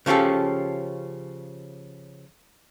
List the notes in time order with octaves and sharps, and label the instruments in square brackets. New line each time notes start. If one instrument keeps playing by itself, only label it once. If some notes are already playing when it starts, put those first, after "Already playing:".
[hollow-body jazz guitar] C#3 F3 C#4 G4 A4